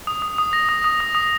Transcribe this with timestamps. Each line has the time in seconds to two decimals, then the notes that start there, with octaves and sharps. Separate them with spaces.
0.07 D#6
0.22 D#6
0.38 D#6
0.53 A#6
0.69 D#6
0.84 D#6
1.00 D#6
1.15 D#6